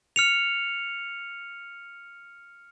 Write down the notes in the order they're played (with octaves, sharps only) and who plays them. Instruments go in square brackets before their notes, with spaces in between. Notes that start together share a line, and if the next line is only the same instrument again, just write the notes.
[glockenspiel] F6 C#7 F7